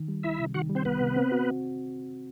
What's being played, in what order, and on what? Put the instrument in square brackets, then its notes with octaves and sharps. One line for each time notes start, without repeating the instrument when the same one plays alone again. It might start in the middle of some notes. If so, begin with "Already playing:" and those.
Already playing: [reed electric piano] D#3
G3
[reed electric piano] C2 [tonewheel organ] E4 E5
[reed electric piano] C3
[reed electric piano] D#3 [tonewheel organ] F#4 F#5
[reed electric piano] G3
[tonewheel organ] C4 C5
[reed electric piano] C2 [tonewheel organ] B3 B4
[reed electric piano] C3
C4
F#4